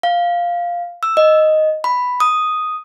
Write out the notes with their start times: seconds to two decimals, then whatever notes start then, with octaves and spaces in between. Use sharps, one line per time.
0.03 F5
1.03 E6
1.17 D#5
1.84 B5
2.20 D#6